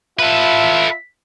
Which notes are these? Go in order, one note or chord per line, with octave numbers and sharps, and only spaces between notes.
F4 A4 B4 E5